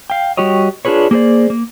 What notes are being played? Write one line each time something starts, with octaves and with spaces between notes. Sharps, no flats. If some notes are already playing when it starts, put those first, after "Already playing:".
F5 G5
G3 F#4 G4 C#5 D#5
D4 F4 G#4 B4 C#5
A#3 G#4 A4 C5 D5
A#3